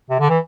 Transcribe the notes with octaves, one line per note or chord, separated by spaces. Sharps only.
C3
D3
E3